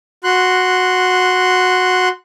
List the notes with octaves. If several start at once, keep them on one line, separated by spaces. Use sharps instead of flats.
F#4 C6 F#6